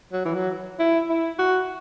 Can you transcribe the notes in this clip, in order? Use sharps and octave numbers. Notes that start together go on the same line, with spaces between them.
F#3
E3
F#3
E4
E4
F#4